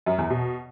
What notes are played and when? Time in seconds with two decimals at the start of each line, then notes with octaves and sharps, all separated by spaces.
0.06 F#2
0.18 E2
0.30 B2